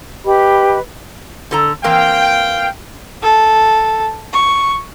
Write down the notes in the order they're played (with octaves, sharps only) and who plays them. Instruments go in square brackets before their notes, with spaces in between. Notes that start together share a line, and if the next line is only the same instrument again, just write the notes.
[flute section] G4 B4 D#5 B5
[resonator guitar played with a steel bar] D3 A4 A#5
[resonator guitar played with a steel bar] E3 A#3 C4 [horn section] F5 G5
[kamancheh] A4
C#6